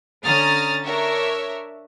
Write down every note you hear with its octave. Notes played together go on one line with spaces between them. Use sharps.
D3 C#4 A#5 D#6 F6 A6
D4 A#4 C#5 E5